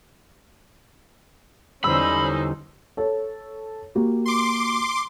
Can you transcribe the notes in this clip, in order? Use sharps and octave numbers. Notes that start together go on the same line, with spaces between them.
E2 D3 G3 C#4 D#4 C5 B5 E6
A4 C#5
A#3 F#4 G4
C6 D6